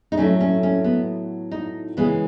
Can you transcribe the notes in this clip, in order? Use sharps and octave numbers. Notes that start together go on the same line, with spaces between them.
D#4
A2 F#3 A3 C#4
C#4
C#4
B3
D#4
C#3 E3 G#3 B3